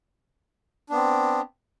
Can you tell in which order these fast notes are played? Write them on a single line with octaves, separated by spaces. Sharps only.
D4 B3 C4